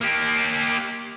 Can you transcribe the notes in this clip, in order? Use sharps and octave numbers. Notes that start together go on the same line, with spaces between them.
A#3 G4